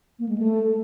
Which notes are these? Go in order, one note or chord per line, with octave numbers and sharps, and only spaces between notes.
A#3
G#3
A3